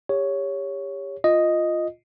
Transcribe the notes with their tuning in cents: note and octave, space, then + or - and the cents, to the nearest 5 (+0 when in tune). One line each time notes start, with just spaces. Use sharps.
G4 +30 C#5 +5
F4 +0 D#5 +0